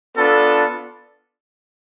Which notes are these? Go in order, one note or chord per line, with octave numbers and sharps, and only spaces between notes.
B3 D4 F4 A4